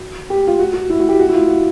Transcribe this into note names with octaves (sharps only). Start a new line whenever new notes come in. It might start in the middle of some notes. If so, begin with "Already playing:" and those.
Already playing: F#4
G4
F4
F#4
F#4
E4
F#4
G4
F#4
E4
F4
F#4